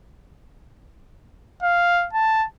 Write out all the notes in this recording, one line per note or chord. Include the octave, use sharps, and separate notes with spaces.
F5
A5